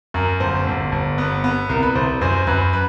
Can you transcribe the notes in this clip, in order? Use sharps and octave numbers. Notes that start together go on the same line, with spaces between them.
F#2 A#4
G1 C5
G1
G1
B3
B3
C2 A#4
B4
C2 C5
F#2 C5
F#2 B4
B4